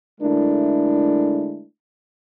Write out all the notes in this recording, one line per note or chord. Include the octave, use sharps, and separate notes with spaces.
D3 G#3 A3 D4 E4 A#4